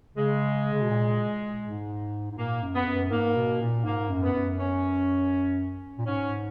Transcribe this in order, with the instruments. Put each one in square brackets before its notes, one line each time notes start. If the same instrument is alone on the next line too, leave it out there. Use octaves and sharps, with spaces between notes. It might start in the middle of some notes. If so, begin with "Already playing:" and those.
[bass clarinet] C#3 [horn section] G#3
[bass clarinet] C#3
B2
A#2
G#2
G#2
[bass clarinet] A#2 [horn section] A#3
[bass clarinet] F#2
[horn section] B3
[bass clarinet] E2
F#2
[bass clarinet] G#2 [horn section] A#3
[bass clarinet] B2
A#2
[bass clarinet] G#2 [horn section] A#3
[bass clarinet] F#2
[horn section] B3
[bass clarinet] F#2
[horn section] C#4
[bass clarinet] A#2
[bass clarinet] G#2 [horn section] C#4